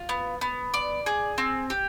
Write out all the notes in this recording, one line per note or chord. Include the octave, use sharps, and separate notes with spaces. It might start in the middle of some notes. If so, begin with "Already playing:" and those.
Already playing: F4
B3
B3
D5
G#4
C4
G4